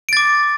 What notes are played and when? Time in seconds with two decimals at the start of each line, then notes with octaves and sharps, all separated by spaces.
0.09 D7
0.13 A6
0.17 D6